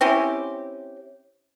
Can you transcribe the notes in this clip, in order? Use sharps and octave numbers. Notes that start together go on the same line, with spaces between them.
C4 C#4 E4 G4